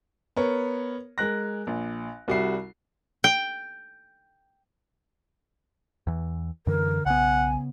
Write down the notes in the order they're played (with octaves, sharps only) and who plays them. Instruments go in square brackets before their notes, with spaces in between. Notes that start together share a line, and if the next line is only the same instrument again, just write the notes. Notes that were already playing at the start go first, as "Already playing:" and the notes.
[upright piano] B3 A#4 C#5
G#3 A#4 F#6 A#6
A#1
C2 G3 F#4 E5 C7
[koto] G5
[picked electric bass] E2 E3
[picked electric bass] F#2 E3 [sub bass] D3 [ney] A#4
[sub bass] B1 [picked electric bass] C#3 B3 [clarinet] F#5 [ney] G#5